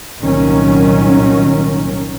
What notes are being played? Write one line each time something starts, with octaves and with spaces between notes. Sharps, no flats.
C2 A#2 D#3 F#3 C#4